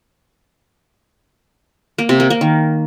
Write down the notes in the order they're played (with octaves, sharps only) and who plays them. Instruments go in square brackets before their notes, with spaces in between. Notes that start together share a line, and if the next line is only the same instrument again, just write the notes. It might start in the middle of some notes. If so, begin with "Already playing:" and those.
[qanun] A#3
C3
A#3
A#3
D#3